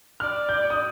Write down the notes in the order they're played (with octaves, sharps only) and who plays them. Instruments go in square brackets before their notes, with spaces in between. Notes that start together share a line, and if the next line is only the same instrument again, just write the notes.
[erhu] D5 [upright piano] F6
[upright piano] G6
D#6